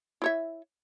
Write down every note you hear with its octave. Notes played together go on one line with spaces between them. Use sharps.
E4 C#5 E5